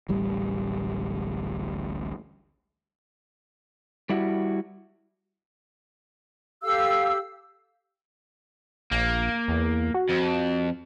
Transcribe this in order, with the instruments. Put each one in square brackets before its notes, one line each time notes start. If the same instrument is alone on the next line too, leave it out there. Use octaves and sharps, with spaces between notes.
[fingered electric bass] D1 A1 G3
[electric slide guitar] G3 E4 F#4
[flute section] G4 A4 F5 E6
[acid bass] A#1 [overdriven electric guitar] A#3
[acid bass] E2
F#4
[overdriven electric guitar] F2